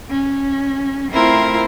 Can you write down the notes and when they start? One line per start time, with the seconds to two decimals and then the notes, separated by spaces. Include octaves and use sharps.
0.10 C#4
1.12 A3 C4 E4 F4 A#4 C5